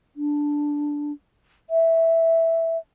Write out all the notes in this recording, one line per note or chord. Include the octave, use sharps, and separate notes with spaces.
D4
E5